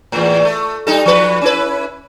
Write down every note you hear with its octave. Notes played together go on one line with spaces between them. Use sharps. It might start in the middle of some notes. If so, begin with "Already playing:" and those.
E2 A2
A3
G3 D#4 A4
F3 B4
C#4 E4 B4